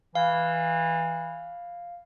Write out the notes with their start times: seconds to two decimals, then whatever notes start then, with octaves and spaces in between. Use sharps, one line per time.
0.15 E3 F5